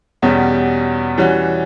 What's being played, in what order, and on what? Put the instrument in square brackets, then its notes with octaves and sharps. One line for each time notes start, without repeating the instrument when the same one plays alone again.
[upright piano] E2 B2 G3 C#4 G4
E3 G3 C#4 F#4